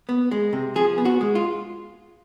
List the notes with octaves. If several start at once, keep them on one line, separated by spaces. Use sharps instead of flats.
B3
G#3
C3
F3 G#4
B3
F#4
G#3
F4